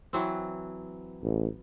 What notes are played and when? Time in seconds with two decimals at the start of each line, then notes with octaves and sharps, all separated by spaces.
0.13 E3 F#3 C4
1.23 A1